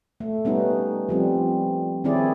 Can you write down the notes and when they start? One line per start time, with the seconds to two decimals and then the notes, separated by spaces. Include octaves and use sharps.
0.20 A3
0.45 G3 B3 C#4 D#4
1.09 F3 G3 C4
2.04 D#3 C4 C#4 E4 G#4 D5